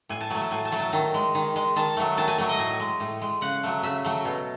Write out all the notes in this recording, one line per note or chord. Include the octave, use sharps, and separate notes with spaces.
A2 G#5
A5
F#3 A3 G#5
A5
A2 G#5
A5
F#3 A3
A5
D#3
G#3
D#3
G#3
D#3 A5
F#3 A3
D#3 A5
G#5
F#3 A3
D#5
A2 G#5
G#3
A2
G#3
C#3 F#5
F#3 A3
C#3 E5
F#3 A3
B2